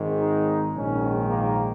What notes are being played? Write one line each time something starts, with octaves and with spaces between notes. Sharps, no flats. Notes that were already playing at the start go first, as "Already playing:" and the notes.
Already playing: G#1 G#2 D#3
D#4
A#1 G#2 D#3 C#4
A#3